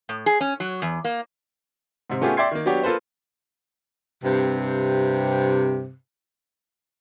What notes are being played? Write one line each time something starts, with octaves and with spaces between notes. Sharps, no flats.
A2
G#4
C#4
F#3
E2
A#3
G#2 C3
A3 B3 C#4 F4 G4 G#4
D5 E5 G5 C6 G#6 C7
D#3 A#3
F#3 B3 D4 G4 C#5
A#3 F4 A4 B4 C5
G2 C3